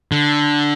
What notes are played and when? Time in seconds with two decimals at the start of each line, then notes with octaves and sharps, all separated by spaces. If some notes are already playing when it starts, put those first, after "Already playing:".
0.12 D3